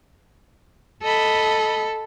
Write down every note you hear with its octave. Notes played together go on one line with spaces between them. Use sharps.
A4 D#5 B5